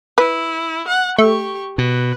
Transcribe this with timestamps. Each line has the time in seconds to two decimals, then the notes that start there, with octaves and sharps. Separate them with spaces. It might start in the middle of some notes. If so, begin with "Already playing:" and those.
0.18 E4 B4
0.88 F#5
1.18 A3 G4 C#6
1.78 B2 B4